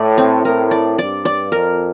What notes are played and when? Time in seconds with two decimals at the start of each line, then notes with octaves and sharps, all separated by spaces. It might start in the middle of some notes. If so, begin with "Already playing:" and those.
Already playing: A2 D5
0.18 C4
0.44 A2 A#4
0.71 D5
0.98 G2 D5
1.25 D5
1.52 F2 A#4